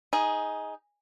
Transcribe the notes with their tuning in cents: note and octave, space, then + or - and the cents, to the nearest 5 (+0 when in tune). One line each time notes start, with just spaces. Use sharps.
D#4 +15 G#4 +0